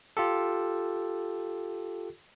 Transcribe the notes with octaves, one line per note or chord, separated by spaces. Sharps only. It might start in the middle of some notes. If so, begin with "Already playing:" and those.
F4 G4 A4